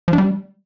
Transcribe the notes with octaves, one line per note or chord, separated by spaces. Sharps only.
F3
D4
G3